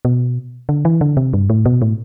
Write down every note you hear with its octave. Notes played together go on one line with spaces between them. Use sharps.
B2
D3
E3
D3
C3
G2
A2
B2
A2